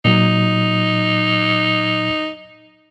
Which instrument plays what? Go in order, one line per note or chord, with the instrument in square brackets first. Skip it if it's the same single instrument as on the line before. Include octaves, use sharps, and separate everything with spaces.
[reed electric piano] A#2 F#3 [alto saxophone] D#4